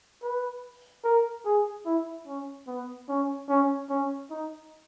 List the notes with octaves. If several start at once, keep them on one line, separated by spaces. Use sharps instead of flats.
B4
A#4
G#4
E4
C#4
B3
C#4
C#4
C#4
D#4